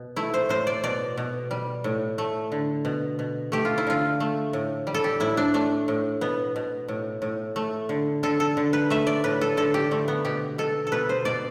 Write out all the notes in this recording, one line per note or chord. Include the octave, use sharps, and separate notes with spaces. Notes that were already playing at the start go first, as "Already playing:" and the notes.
Already playing: B2
A3 E4
C5
A2 C5
D5
B2 D5
B2
G3
A2
A3
D3
B2
B2
A3 G4
F4
E4
D3 F4
A3
A2
G3
A4
G4
A2 E4
D4
A3 D4
A2
B2 B3
B2
A2
A2
A3
D3
D3 A4
A4
D3
B4
A3 E5
D5
A2 B4
A4
D3 A4
G4
D3 A3
B3
B2 G4
B2 A4
A4
B2 B4
C5
B2 D5